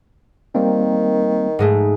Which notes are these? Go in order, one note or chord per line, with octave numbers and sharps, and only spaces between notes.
D#3 G3 A#3 C4
G#2 G#3 A3